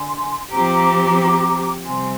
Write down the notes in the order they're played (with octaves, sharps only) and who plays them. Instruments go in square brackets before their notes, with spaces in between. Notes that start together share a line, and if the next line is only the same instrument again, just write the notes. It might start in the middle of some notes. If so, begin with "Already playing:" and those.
Already playing: [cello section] D3 [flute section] G#5 C6
[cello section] F3 C4 G4 [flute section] A#5 D6
[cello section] C3 G3 C4 [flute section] G#5 C6